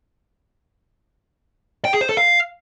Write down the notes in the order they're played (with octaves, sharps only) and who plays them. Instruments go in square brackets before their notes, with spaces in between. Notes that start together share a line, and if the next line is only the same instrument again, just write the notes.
[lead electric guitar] G5
G#4
C5
A4
F5